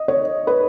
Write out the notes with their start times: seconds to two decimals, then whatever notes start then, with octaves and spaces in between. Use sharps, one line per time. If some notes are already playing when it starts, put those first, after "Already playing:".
Already playing: D#5
0.08 C#5
0.47 B4